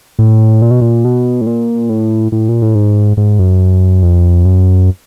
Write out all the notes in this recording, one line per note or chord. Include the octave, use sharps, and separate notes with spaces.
A2
A#2
B2
A#2
B2
A2
A#2
A2
A2
A#2
A2
G#2
G#2
F#2
F2
F#2